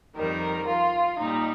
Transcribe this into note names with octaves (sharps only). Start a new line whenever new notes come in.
F2 D#3 G3 A#4
F4
A#2 G3 D#4